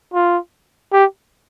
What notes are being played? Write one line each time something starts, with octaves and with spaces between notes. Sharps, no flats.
F4
G4